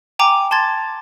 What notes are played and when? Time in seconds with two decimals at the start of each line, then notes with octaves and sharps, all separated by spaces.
0.19 G5 G#5 A#5 D6
0.51 A5 C6 G#6 A6